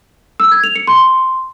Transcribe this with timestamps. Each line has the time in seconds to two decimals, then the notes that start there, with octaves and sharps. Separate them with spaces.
0.40 E6
0.52 G#6
0.64 F7
0.76 C#7
0.87 C6